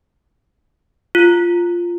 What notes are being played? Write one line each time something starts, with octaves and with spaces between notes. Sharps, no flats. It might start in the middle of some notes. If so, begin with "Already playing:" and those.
F4